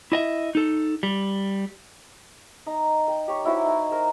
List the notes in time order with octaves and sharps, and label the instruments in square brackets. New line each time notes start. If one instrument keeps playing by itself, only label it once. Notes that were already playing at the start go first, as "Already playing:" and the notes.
[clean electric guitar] E4 D#5 E5
D#4 A4
G3
[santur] D#4
G5
G4 C#5
D#4 E4 F#4 C5
D#4 G#5
A#4 C5